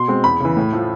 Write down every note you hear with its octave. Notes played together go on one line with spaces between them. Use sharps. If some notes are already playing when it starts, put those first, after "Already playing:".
Already playing: B2 C6
G#3 C4
E2 B5
C#3 E3
A2
F3 A3